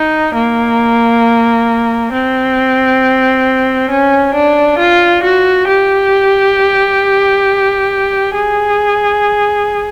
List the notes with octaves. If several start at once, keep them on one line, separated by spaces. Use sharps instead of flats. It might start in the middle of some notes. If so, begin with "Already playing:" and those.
Already playing: D#4
A#3
C4
C#4
D4
F4
F#4
G4
G#4